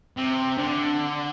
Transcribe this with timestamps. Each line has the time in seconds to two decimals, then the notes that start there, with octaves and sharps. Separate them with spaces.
0.17 C3
0.58 D3